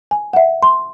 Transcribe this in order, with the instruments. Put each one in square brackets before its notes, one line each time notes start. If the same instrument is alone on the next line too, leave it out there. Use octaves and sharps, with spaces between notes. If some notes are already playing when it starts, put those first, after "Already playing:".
[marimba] G#5
E5 F#5
C6